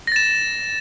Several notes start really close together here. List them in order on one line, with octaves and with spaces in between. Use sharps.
A#6 A6 E7